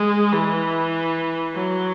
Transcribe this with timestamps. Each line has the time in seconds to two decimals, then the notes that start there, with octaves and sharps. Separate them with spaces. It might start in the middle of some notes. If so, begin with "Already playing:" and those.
Already playing: G#3
0.32 E3
1.54 F#3